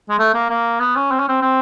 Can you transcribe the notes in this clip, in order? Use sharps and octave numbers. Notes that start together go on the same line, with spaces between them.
G#3
A3
A#3
A#3
B3
C#4
C4
C#4
C4
C4